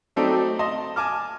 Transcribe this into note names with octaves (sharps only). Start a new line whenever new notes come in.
F#3 A3 C4 D#4 A4 D5
D#5 A5 C6
G#5 A5 D6 F6